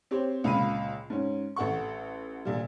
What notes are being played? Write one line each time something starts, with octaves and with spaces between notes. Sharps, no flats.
C4 G4 C5 C#5
C#2 A#2 F5 B5 D#7
G#2 C#4
A1 A4 F#5 C#6
A#1 A#2 G3